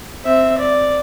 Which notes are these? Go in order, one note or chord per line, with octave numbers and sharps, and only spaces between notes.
C4 E5
D5